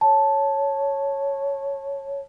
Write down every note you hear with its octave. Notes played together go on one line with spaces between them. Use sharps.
C#5 A5